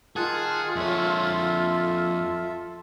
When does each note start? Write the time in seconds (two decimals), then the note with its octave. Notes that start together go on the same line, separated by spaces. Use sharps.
0.16 D#3 F4 G#4 F#5 A5
0.76 F2 A4 C#5 E5